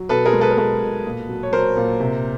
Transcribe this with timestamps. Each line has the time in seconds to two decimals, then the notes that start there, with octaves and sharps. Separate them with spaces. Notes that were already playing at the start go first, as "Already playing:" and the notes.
Already playing: F#3
0.09 B2 A4 B4
0.25 G#4 A#4
0.33 G#3
0.41 A4 B4
0.51 A#4
0.57 G#3 A4 B4
0.82 B2
1.06 A#2
1.29 F#3
1.43 C#5
1.52 F#3 A#4 C5
1.77 A#2
2.00 C3